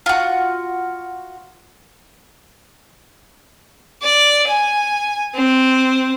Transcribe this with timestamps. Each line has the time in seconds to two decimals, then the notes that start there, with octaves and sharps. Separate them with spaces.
0.06 F4 F#4
4.03 D5
4.48 G#5
5.35 C4